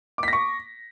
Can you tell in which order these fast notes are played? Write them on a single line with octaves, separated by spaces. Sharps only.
D6 B6 A#6 C#6